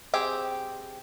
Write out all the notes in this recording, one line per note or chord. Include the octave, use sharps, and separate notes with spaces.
C4 G4 G#4